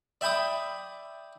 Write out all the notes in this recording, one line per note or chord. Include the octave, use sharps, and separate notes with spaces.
D5 E5 G5 B5 D6 D#6